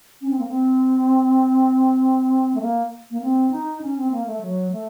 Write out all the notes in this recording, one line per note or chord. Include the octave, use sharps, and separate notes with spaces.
C#4
C4
A#3
C4
A3
A#3
A#3
C4
D#4
C#4
C4
A#3
A3
F#3
A3